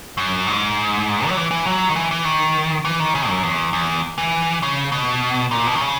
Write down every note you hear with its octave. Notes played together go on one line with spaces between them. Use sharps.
F#2
G#2
F#3
E3
E3
F#3
D#3
E3
E3
D#3
E3
D#3
C#3
F#2
E2
E2
E3
C#3
B2
A#2
B2
D#3
C#3